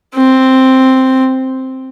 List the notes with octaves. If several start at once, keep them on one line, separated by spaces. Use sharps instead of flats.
C4